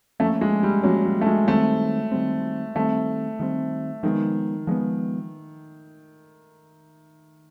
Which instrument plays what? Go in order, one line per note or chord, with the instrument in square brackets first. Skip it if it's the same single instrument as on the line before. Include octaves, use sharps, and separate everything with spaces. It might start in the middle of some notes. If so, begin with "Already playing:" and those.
[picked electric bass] F3 A#3 C#4 [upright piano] A3
[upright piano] G#3
G3
[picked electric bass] F3 A#3 C#4 [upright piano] F#3
[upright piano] G3
A3
G#3
[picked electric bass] D#3 G3 C4 [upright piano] A3
[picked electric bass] D#3 G3 C4
[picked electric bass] D#3 G3 C4 [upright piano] A3
[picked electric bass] D#3 G3 C4
[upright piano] D#3 [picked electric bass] F3 G#3 B3
[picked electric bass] F3 G#3 B3